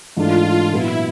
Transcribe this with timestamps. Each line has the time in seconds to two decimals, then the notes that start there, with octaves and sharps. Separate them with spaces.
0.16 G#2 E3 A3 D4 F4
0.72 A#2 F#3 B3 E4